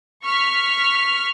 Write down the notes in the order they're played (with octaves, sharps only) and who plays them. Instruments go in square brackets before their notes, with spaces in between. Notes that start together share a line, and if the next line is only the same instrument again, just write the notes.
[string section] C#6 F6 B6